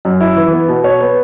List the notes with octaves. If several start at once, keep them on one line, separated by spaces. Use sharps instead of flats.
F#2
E4
E3
B3
B2
C#5
B3